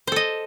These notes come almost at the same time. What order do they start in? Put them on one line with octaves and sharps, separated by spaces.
C5 A4 D#5